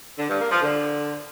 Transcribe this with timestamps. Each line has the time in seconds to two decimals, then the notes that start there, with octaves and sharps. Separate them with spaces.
0.18 D3
0.29 G2
0.40 A#3
0.51 F3
0.62 D3